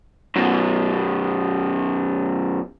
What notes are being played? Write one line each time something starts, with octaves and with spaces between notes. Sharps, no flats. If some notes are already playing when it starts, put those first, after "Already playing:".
F#2 B2